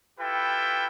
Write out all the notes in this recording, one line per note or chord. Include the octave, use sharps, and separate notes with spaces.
E4 F4 G4 A4 B4 G5